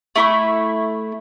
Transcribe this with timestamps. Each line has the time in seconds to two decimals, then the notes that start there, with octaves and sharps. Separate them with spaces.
0.16 A3 E4 B5 C#6